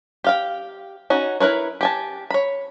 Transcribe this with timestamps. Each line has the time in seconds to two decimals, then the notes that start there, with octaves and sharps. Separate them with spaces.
0.24 G4 F5 G5
1.10 C#4 D#4 F#4
1.40 E4 A#4 B4 C#5
1.81 G4 G#5 A5
2.31 C#5 B5